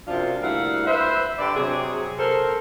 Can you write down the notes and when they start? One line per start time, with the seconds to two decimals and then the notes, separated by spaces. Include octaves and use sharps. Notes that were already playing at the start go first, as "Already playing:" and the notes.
0.07 F#2 C3 F3 D4 F4
0.41 D2 G3 A#3 E4 F5 F#5
0.87 B4 C5 E5
1.39 D3 G4 B4 D5
1.56 C3 F#3 G#4
2.18 A4 A#4 C5